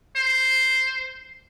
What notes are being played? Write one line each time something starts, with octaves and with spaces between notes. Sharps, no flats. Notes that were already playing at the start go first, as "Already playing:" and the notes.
C5